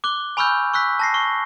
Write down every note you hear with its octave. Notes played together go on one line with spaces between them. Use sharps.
D6 F#6 G7
G#5 B5 C#6 E6 F6 G6
C#6 E6 F#6 B6
A5 A#6 C7
C#6